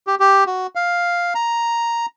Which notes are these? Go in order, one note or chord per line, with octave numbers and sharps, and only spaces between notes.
G4
G4
F#4
F5
A#5